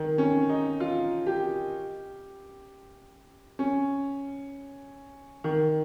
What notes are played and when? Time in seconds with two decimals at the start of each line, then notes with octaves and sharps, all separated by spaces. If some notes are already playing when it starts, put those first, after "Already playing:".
Already playing: D#3
0.18 C#4
0.50 D#4
0.80 F4
1.26 G4
3.59 C#4
5.44 D#3